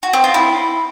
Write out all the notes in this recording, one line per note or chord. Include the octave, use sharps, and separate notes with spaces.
F#4
C4
F4
E4